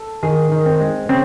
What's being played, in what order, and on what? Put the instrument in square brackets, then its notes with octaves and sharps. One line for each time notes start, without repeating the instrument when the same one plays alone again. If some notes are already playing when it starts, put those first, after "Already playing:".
Already playing: [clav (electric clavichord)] A4
D#3 G#4
D#3
C4
G#3
C#3 C4